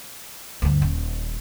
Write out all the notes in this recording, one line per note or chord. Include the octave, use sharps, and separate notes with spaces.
D2 G2
D#1